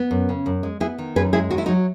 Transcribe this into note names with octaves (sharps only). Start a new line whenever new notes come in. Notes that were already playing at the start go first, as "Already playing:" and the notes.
Already playing: B3
F#2
C#3
F#2
G#3
B3 E4 G#4
D#3
F#2 G#4 B4
G#3 E4 G#4
D#3 F#4
E4
F#3 D#4 F#4